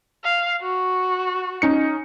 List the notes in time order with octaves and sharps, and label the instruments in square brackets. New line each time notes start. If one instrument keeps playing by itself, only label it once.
[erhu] F5
F#4
[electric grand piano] C#4 D#4 C#7